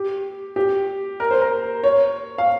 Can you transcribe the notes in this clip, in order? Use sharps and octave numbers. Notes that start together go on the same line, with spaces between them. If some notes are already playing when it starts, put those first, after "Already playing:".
Already playing: G4
G4
A#4
C5
A#4
C#5
F5